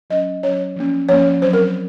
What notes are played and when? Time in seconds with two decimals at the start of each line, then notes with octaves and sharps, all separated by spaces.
0.10 F#3 C#4 D#5
0.43 F#3 C#4 C#5
0.76 F3 A#3 C#4
1.08 F3 A#3 C#4 C#5
1.42 F#3 C4 C5
1.53 A#4